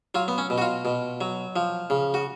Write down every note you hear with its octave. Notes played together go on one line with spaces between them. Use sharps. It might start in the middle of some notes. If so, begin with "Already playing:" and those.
F#3 F4
B3
C#4
B2
F#4
F4
B2
F#3
F3
C#3
F#4